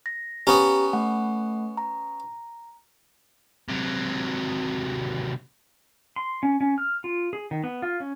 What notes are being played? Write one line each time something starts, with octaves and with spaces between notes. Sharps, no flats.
A#6
B3 C#4 G4 A#5
A3 F#5
A#5
C3 F#3
C6
C#4
C#4
F6
F4
G#4
D#3
B3
F4
C#4